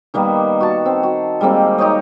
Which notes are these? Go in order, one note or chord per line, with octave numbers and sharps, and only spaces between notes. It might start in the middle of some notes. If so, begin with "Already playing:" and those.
D#3 G3 A#3 B3
F#4 A5
C4
F#4
G3 G#3 A#3 C4
D#4 G4 C#5 D#5